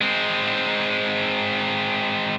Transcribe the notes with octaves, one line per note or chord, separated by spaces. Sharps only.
G#3 C4